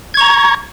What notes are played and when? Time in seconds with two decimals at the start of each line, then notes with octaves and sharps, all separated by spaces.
0.14 G#6
0.17 C#6
0.21 A#5